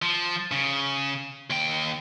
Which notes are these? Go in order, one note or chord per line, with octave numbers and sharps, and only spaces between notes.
F3
C#3
D#2 G5